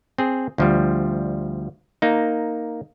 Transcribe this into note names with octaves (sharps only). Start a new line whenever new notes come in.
C4 G#4
D2 F3 G3
A#3 D#4